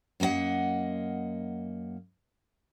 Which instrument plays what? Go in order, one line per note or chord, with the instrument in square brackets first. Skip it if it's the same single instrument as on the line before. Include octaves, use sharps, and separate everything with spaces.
[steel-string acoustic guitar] F#2 A#3 F#4 D#5 F#5